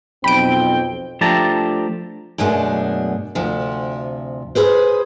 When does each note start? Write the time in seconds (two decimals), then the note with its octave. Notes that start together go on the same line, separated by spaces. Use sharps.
0.24 B1 F2 C4 G5 B5 D7
1.21 F3 A3 D4 G4 A5 A#5
2.38 F#2 B2 G#3 A3 D4
3.35 D2 C3 F3
4.55 G#4 B4 C5